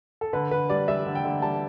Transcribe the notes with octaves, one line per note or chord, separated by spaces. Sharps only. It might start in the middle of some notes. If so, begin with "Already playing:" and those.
A4
D3 B4
D3 B4
G3 D5
G3 E5
D3
G5
D3
G3 A5